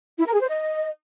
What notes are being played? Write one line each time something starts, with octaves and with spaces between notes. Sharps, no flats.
E4
A#4
G#4
C5
D#5